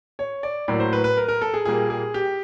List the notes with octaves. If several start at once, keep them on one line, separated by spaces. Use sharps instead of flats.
C#5
D5
A2 F#3 A#3 D5
C5
B4
B4
A#4
A#4
A4
G#4
A#2 G3 A#3 G#4
G#4
G4